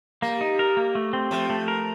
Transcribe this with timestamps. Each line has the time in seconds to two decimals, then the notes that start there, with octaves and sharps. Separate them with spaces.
0.22 G3 A#3
0.41 D#4
0.59 A#4
0.77 A#3
0.95 A3
1.13 C4
1.31 F3 A3
1.50 A3
1.68 A#4